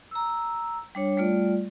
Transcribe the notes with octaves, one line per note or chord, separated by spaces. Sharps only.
A#5 E6
G3 D4 C#5
G3 A3 F4 D5